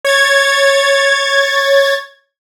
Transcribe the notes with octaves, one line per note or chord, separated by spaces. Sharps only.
C#5 G#6 A6